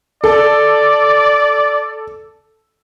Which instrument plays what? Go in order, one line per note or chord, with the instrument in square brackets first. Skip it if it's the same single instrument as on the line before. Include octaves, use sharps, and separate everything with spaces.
[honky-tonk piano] A4 [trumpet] D5